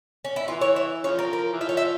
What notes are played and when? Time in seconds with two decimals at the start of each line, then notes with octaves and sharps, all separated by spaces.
0.25 C#4
0.36 E4
0.48 E3 F4
0.61 C#5
0.76 E5
1.04 C#3 F3 C#5
1.19 A#4
1.33 A#4
1.53 E3
1.60 F3 E5
1.69 C#5
1.77 E5